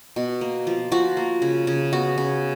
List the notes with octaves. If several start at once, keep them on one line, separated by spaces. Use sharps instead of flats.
B2
A#3
F3
F3 F#4
A#3
C#3
C#3
B3 F#4
C#3